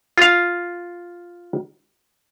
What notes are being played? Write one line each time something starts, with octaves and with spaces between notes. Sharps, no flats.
F4 F5